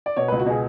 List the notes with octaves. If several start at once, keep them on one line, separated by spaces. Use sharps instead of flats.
D5
B2 C#5
C#2 B4
F#4
B2 G#4